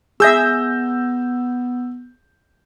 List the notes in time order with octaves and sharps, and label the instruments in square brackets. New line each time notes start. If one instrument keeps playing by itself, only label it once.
[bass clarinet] B3 [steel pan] G#4 E5 [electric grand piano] E6 G6 A#6